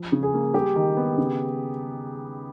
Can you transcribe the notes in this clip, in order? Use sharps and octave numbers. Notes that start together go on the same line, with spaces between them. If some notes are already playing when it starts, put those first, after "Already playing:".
Already playing: F3
C#3
G#4
A#3
G3 G4
D#3
B3
C#3